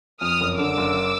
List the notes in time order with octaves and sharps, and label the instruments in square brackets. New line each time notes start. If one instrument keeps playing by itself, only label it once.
[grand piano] F2 [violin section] D#6 F6
[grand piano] F#1
[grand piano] D3 [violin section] D6 E6
[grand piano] F#1